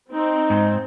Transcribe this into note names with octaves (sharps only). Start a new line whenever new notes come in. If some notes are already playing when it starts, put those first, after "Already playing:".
C4 D#4
G#2